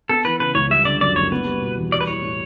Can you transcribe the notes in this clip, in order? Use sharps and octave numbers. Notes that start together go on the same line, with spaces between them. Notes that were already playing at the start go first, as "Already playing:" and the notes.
B3 A4
E3 B4
C#3 B4
C#2 C#5
G3 E5
D3 D5
F#2 D5
F#1 C#5
B3 B4
G3
B2
E2
G3 D5
B4
E3 C#5
A2